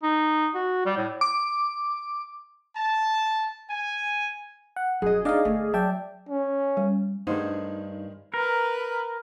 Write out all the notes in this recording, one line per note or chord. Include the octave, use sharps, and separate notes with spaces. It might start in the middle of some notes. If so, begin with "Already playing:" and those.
D#4
F#4
G3
A2
D6
A5
G#5
F#5
E1 F#2 G#4 D#5
D4 D#4 D5 D#5 F5
G1 A3
F#3 D5 E5 G5 A5
C#4
G3
G2 D#3 A3 D4 D#4 G#4 C5 F5
A#4 B4 A#5